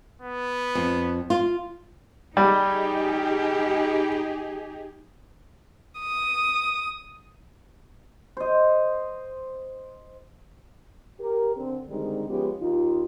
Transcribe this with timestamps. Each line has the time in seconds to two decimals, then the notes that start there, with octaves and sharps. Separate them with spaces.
0.22 B3
0.75 F2
1.30 F4
2.37 G3 D#4 G4 G#4
6.01 D#6
8.37 C5 D#5
11.19 G4 A#4
11.55 D3 C4
11.89 D3 D#3 G3 G#3 C4 D#4
12.28 F3 G#3 B3 C#4 F4 G4
12.60 D#2 D#4 F4